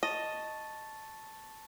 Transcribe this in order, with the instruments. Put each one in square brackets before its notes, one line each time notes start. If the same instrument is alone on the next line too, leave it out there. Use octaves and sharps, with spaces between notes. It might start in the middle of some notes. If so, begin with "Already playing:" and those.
[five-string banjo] D#5 [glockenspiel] A5 C#6 A6